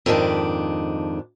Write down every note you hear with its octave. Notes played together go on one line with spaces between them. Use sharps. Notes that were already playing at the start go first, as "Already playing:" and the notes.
F2 G#2 D#3 D4